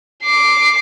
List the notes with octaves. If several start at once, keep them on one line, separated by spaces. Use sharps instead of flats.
D6 C7